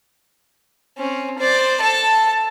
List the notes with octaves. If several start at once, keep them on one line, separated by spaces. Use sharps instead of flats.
C4 C#4
C5 D5
A4 A5